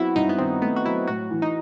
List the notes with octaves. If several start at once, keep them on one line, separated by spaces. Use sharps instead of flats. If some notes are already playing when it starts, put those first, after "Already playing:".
Already playing: F#3 B3 C4 E4 F#4
G2 D#4
B3
D#3 C4
A3 B3
F#4
F#3 E4
A2 F#4
E3
D#4